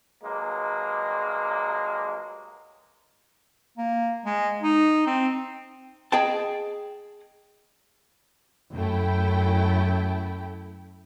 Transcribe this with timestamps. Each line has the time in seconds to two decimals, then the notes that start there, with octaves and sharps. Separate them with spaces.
0.24 G2 F#3 G#3 A#3
3.78 A#3
4.25 G#3
4.63 D#4
5.07 C4
6.12 G#4 D#5 G5 A5
8.73 F#2 A3 E4 G5